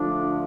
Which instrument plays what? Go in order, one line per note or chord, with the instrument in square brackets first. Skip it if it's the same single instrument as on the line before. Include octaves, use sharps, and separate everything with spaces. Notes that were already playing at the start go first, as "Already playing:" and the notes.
Already playing: [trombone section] D3 F3 A3 D4